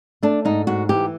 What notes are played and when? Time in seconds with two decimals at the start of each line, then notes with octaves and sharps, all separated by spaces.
0.23 A3 D4
0.45 G#2 D#4
0.67 G#2 F#4
0.89 E3 G4